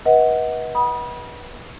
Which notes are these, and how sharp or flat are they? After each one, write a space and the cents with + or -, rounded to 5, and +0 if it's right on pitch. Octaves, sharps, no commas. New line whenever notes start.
B4 -30 D#5 +35 F#5 +0
F#5 +30 B5 -30 D#6 +0